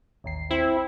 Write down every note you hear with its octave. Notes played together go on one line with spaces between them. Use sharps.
A1 D#2 C7
C4 E4